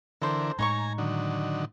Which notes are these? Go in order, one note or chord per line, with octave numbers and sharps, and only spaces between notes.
D3 E3 A4 A#4 C5
A2 G#3 D#4 C#5 G#5 A#5 C#6
D3 D#3 F#3